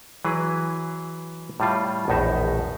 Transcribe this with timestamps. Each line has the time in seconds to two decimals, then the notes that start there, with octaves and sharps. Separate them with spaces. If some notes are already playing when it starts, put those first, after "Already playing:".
0.25 E3 F#3 G#4 B4
1.60 A2 G3 F4
2.08 A#1 E2 A2 D#4 E5